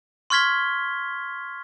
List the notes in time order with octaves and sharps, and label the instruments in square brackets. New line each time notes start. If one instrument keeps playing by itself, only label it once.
[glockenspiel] C6 C#6 F6 G#6 B6 G7